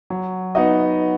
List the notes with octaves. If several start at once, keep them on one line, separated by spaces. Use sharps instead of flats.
F#3
B3 D#4 F#4 D#5